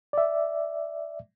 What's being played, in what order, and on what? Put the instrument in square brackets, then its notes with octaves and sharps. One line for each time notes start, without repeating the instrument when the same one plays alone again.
[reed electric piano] D5 E5